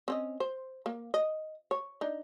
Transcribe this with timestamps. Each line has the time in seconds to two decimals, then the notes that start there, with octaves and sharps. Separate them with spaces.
0.08 C4 C#4 D#5
0.40 C5
0.86 A#3
1.14 D#5
1.71 C#5
2.01 D4 D#4